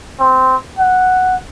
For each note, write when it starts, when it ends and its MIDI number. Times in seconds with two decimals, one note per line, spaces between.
0.20 0.56 60
0.79 1.37 78